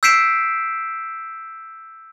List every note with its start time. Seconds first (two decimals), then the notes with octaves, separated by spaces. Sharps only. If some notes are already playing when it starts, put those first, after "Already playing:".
0.03 E6 G6 B6 C7 D7 E7